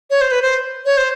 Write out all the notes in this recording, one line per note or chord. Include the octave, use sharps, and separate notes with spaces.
C#5
C5
B4
C5
C#5
C5